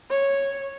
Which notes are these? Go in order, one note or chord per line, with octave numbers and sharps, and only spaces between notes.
C#5